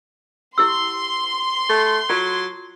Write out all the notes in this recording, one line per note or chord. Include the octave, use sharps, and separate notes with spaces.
E4 G4 C6 E6
A3
F#3 F4